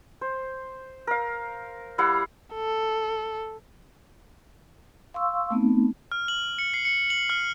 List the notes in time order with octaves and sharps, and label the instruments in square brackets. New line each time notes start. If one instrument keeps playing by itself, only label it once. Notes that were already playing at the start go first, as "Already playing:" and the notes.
[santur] C5
A#4 F5
G3 E4 F5 F#5
[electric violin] A4
[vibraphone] F5 C6 C#6 E6
A3 B3 C4 D#4
[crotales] F6
F#7
C#7
C7
C#7
F#7
F6